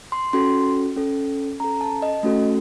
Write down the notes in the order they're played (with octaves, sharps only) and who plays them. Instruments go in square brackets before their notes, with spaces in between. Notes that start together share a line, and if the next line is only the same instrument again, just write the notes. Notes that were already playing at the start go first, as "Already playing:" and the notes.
[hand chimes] C6
C#4 F#4 A4 C6
C#4 A4
C#4 A4 A#5
A5
D#5
A3 C#4 F#4 A4